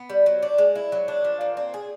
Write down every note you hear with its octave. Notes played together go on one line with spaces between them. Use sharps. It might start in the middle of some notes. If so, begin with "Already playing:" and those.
Already playing: B3
G3
F#3
D4
G#3
E4
F#3
D4
F3
A#2
C4
G#4